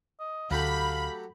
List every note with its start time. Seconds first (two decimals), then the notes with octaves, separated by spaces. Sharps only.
0.19 D#5
0.51 D2 F#3 A3 G4 F5 B5